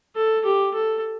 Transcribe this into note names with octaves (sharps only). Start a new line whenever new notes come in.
A4
G4
A4